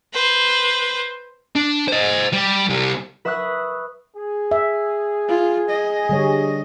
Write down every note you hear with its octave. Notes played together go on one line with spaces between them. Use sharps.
B4 C5
D4
C5 D#5
G3
C2 G3
B4 E5 B5 C#6 D#6 F#6
G#4
E5
F4
D#5
D3 G3 C#5